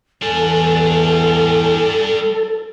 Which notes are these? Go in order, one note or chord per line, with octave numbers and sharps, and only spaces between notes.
E2 G3 D4 A4 G#5